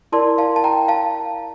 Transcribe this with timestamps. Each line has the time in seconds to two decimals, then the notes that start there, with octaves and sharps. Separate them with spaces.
0.12 E4 A#4 D5 A5 C6
0.38 F5 A5
0.56 A5
0.64 G5 A#5
0.88 F5 A5